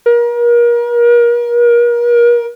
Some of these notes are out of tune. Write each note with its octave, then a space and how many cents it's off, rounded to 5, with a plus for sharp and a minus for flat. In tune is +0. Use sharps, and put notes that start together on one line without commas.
A#4 +35